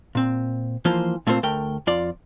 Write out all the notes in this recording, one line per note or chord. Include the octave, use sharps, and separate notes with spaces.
A#2 C4
E3 F3 A#3 F4 C5
A#2 A3 A#3 C4 F4 C5
D2 A3 A#4 G5
F2 F4 D5